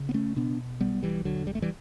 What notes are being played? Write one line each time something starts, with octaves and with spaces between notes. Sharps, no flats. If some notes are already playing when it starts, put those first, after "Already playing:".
Already playing: C#3
B3
A3 C#4
B2 B3 D4
B1 G3 B3
E3 G3
E1 D3 F#3
G3
A3
E3 G3